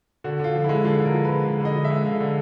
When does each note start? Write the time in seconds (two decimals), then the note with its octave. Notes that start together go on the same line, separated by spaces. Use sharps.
0.24 D3 F#4
0.39 D3 F4
0.55 F3
0.64 G#3 E4
0.84 D3 F4
1.00 D3
1.05 A#4
1.14 F3
1.25 G#3 B4
1.45 D3
1.60 D3
1.65 D#5
1.75 F3
1.85 E5
1.90 G#3
2.05 D3 F5
2.20 D3